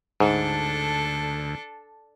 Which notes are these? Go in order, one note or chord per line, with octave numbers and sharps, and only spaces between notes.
D2 G#2 D4 A4